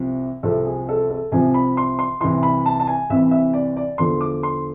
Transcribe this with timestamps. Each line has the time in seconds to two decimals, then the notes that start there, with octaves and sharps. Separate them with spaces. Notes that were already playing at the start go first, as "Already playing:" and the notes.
Already playing: C2 C3 F3
0.43 C2 C3 F3 A4
0.65 G#4
0.89 A4
1.10 A4
1.32 C2 C3 F3 G#5
1.54 B5
1.77 C6
1.99 C6
2.20 C2 C3 E3 C6
2.43 B5
2.66 A5
2.80 A5
2.87 G#5
3.10 C2 C3 E3 E5
3.31 E5
3.53 D5
3.77 D5
3.98 E2 D3 F3 C6
4.21 D6
4.43 C6